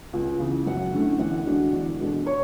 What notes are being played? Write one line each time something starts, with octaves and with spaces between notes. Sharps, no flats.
C#2
C#3 E3
F#2 F#5
D3 A3 C#4 E4
E2 F#5
D3 G#3 D4 F#4
E2
B2 G#3 D4 A4
C#5